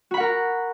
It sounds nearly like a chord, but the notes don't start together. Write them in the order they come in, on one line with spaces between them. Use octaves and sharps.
F#4 B5 F#5 A#4 A#5